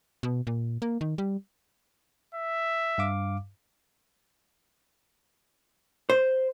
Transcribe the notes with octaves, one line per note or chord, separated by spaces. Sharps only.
B2
A#2
A#3
D#3
G3
E5
G2 F5 D6
C5